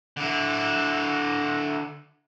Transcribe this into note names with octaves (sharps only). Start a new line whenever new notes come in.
D3 E4